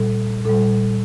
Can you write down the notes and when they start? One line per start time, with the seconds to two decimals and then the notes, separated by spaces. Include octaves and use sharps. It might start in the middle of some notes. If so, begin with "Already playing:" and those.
Already playing: A#2 G3 A4
0.45 A#2 G3 A4